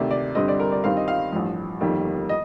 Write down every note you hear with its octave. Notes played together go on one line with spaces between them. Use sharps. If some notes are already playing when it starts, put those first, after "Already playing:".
Already playing: D2 C3 D#3 D5
D5
G2 D3 G3 C4 D#5
D5
A#4
D5
G2 D#3 G3 C4 F5
D#5
F5
A1 G2 F3
G1 F2 D#3 G3 A#3
D#5